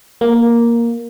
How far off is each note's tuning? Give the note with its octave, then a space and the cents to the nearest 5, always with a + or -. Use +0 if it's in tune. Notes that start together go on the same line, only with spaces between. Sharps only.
A#3 +5